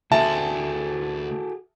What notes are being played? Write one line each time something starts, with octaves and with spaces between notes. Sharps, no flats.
D2 F#4 G#4 A4 E5 A5